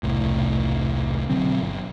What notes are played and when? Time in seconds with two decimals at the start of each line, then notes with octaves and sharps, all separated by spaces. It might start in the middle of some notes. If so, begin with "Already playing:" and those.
0.03 E1 C2 A2
1.29 B2 D3 F#3 C4
1.61 G1